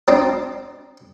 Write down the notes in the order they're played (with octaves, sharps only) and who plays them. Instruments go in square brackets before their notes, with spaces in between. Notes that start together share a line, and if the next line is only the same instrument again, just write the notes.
[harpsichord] C4 D4 D#4